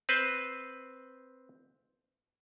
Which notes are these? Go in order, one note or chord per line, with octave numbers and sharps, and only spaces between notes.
C4 B4 C5